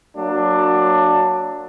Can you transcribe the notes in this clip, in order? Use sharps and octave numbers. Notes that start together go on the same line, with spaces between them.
F#3 A#3 D4